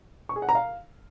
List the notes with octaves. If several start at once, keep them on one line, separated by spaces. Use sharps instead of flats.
C#6
G#4
F#5
A#5
F5